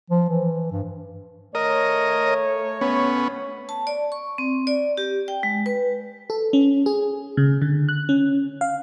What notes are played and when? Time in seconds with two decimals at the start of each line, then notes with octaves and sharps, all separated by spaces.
0.10 F3
0.30 E3
0.71 G2
1.55 A3 A#4 C#5 D#5
2.81 B3 C#4
3.69 A5
3.87 D5
4.12 C#6
4.38 C4
4.67 D5
4.97 G4
5.28 G5
5.43 G#3
5.66 B4
6.30 A4
6.53 C#4
6.86 G#4
7.37 C#3
7.62 D3
7.89 F#6
8.09 C#4
8.61 F5